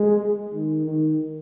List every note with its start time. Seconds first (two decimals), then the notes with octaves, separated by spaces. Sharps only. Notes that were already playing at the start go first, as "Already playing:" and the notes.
Already playing: G#3
0.54 D#3
0.85 D#3